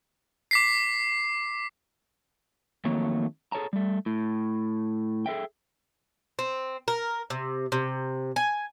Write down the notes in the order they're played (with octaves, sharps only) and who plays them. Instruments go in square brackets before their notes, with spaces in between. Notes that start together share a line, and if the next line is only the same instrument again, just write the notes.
[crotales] D6 B6 C7
[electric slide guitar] F2 D#3 F#3 A3 A#3 C#5
G#4 A4 C#5 A5 A#5
G3 A3
A2
G#4 A4 E5 G5
[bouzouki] C4
A#4
C3
C3
G#5